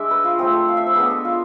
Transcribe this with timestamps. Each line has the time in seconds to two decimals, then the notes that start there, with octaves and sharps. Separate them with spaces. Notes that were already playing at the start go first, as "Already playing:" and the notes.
Already playing: G#3 D4 D5 E5
0.11 B4
0.24 F4
0.38 F3 A3 C4 G#4
0.53 A4
0.68 F5
0.77 E5
0.87 C5
0.96 G#3 B3 D4 B4
1.10 A4
1.25 F4